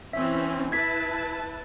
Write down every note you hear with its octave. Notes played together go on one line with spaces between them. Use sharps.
E3 C4 C#4 E5
E4 B4 A5 G#6 B6